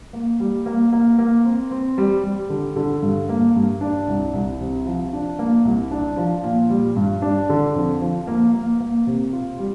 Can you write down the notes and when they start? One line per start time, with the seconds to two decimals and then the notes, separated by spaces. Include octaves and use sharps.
0.13 A#3
0.40 G3
0.66 A#3
0.93 A#3
1.19 A#3
1.45 C4
1.71 C4
1.98 G3
2.23 G3
2.50 D3
2.76 D3
3.02 G2
3.29 A#3
3.55 G2
3.81 D4
4.08 C2
4.34 C2
4.60 C3
4.86 F3
5.13 D4
5.39 A#3
5.65 C2
5.91 D4
6.17 F3
6.44 A#2
6.70 G3
6.96 G2
7.22 D4
7.49 D3
7.75 F2
8.01 F3
8.27 A#3
8.54 A#3
8.81 A#3
9.07 C3
9.33 F4
9.59 G3